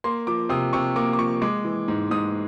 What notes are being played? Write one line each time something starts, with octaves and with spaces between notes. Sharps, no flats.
A#3 C6
F3 D6
C3 D#6
C3 C#6
A#3 D6
D6
F3 C#6
G#3 D6
E3
G#2
G#2 D#6